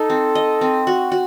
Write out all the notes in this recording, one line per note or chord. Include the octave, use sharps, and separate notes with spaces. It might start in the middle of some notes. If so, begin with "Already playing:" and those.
Already playing: D#4 A4
C4
D#5
C4
F#4
F#4